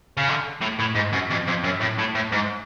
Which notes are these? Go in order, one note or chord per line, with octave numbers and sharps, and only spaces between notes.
C#3
D3
A2
A2
G#2
F#2
F2
F2
F#2
A2
A2
A2
G#2